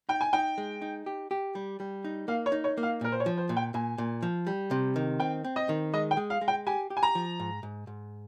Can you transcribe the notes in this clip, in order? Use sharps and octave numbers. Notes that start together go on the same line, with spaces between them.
D#4 G5
G#5
D#4 G5
G#3
D#4
G4
G4
G3
G3
D#4
A#3 F5
C#5
D#4
C#5
A#3
F5
A#2 A#4
C5
C#5
F3
C5
A#2
G5
A#2 G#5
A#2
F3
G3
C3
D#3
C4 G5
C4
D#5
D#3
G#3 D#5
G5
G#3
F5
G#3
G5
G4 G#5
G4
G#5
A#5
F3
G#2
G#2
G#2